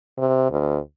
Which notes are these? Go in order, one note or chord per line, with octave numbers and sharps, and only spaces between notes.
C3
D2